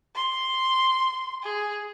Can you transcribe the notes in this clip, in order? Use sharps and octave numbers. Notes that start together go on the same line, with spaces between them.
C6
G#4